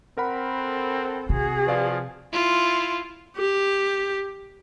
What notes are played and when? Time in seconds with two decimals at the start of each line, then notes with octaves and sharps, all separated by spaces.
0.17 C4 A#4 F#5 B5
0.54 A4
1.29 C3 F#4 G#4
1.67 F3 B4 D5 F5
2.33 E4 F4
3.37 G4